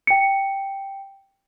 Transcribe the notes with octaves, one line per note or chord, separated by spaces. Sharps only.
G5 C#7